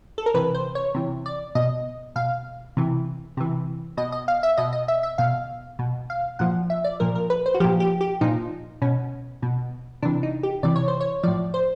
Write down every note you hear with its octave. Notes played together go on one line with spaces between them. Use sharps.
A4
A#4
C3 E3 B4
C5
C#5
C3 E3
D5
B2 D#5
B2 F5
C3 E3
C3 E3
B2 D#5
D#5
F5
E5
B2 D#5
D#5
E5
E5
B2 F5
B2
F5
A#2 F3 F#5
E5
D5
A#2 F3 A#4
A#4
B4
C5
F#4
A#2 F3 G4
G4
G4
A#2 F3 D#4
B2 C#4
B2
C3 E3 D4
D#4
G4
C3 E3 D5
C#5
C5
C#5
A2 F3 D5
C5